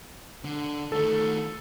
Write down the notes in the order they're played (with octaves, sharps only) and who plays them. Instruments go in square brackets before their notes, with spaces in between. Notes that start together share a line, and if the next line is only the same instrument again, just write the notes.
[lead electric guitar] D3
[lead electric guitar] D#3 A3 [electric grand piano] A4